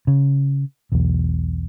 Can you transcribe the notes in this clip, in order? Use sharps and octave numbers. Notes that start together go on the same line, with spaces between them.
C#3
B1 E2